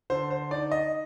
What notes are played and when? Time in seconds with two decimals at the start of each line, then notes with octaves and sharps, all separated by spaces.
0.10 D3 C5
0.30 C5
0.51 D#4 D5
0.72 D#5